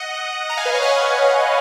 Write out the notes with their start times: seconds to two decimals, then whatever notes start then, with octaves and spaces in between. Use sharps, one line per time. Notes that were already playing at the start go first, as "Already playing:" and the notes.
Already playing: D#5 F#5
0.49 F#5 A#5
0.57 F5 G#5
0.65 B4 D#5
0.74 C#5 F5
0.82 D#5 F#5